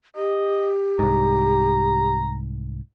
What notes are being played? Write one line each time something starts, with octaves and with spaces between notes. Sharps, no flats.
G4 D#5
C2 G#2 A#5